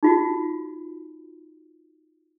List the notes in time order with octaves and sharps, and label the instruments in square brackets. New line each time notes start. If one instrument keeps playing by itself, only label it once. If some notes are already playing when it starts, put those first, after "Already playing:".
[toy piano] D#4 F4 F#4